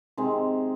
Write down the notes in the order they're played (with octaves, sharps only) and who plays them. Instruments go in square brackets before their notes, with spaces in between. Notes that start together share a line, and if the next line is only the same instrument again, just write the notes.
[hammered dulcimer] C3 D#3 G#3 C4